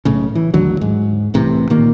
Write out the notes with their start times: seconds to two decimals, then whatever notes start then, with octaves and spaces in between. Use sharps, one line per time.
0.05 B1 A2 C#3
0.35 E3
0.54 A1 D#2 D3 F#3
0.81 G#2
1.34 C2 A2 C3 E3
1.70 A#2 D#3 A#3